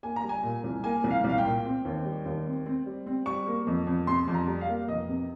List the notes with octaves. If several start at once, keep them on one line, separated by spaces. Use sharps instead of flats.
A#3 G#5
A#5
G3
G#5
A#2
C2
A#3 G#5
C2
F5
C2
F5
G5
A#2
C4
D#2
G3
D#2
C4
C4
G3
C4
G3 C#6
A#3
F2
F2
C3 C6
F2
A#5
G3
F5
A#3
F1 D#5
C3